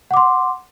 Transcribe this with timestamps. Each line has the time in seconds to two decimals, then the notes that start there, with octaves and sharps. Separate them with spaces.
0.11 F#5
0.14 D6
0.17 C6